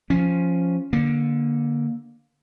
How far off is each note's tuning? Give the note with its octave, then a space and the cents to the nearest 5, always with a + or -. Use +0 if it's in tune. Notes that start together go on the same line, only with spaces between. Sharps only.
F3 +0 C#4 +0
D3 +0 A#3 +20